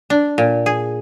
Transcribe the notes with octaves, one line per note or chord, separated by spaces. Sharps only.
D4
A#2
G#4